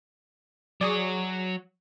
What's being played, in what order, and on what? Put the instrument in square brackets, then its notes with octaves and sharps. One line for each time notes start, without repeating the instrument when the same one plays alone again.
[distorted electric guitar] F#3 C#5 [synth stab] G#4 D5